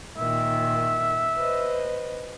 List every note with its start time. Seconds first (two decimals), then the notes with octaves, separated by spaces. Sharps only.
0.18 A#2 D#3 E5
1.36 B4 C5 D#5